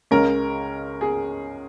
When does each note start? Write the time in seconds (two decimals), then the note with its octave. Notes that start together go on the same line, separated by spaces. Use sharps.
0.11 C#2 C#3 G#3 C#4 A#4
1.01 G#4